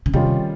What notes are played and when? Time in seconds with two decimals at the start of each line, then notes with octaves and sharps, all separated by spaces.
0.06 C#3
0.13 C3 D#3 G3 C#4 F4